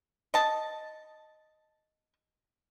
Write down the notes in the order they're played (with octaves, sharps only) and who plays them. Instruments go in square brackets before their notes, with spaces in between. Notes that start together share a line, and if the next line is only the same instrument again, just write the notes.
[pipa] D#5 A5